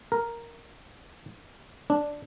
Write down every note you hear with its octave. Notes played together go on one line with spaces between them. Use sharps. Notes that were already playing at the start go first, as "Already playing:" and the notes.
A#4
D4